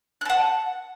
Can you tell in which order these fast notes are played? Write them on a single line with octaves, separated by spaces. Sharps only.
F#6 A5 F#5